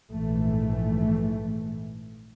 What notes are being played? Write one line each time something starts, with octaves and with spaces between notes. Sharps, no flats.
A#1 G#2 E3 A3